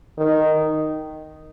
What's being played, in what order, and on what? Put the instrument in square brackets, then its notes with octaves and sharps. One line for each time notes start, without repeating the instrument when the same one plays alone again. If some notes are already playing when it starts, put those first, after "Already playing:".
[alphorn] D#3